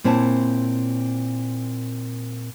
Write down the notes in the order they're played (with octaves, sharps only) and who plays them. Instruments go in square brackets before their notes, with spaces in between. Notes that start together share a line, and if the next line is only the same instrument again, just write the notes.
[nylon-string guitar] A#2 C4 E4 C#5 A5